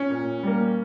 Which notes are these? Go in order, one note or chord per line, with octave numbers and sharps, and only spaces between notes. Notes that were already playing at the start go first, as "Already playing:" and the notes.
Already playing: C#4
A#2
G3 A#3